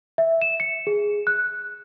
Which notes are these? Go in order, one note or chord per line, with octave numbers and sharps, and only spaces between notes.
E5
E7
C#7
G#4
F#6